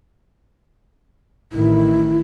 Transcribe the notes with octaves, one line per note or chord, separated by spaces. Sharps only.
A1 D#3 E4